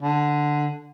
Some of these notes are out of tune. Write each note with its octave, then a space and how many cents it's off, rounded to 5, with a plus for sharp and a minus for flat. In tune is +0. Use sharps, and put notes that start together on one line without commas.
D3 +5